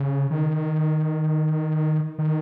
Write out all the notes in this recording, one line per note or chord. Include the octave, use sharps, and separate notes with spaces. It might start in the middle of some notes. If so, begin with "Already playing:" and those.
Already playing: C#3
D#3
D#3